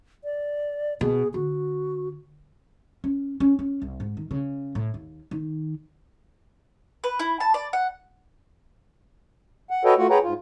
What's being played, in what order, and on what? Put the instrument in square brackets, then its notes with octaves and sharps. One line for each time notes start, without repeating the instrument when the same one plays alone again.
[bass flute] D5
[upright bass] B2 [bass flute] G#4
[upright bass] D3 [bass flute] F#4
[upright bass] C#4
C#4
C#4
C2
G#2
D#3
C#3
A2
D#2
D#3
[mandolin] B4
E4
A5
D5
F#5
[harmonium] F#5
F#4 A4 B4 C#5 D#5 G5
A3 F4 F#4 F#5
G#4 B4 C#5 F#5 G5 A#5
G#2 F4